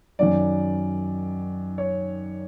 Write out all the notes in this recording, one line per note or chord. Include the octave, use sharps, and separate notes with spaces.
F#2 D#3 F#3 D5
C#5